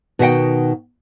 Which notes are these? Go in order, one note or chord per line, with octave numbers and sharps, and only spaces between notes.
B2 D#3 F#4 E5 F#5 G5